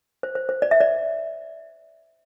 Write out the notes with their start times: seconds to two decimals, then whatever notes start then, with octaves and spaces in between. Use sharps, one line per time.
0.23 C5
0.35 C5
0.49 C5
0.62 D5
0.71 E5
0.80 D5